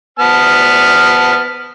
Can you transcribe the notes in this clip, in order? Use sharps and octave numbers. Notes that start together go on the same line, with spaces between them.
B3 A5 F6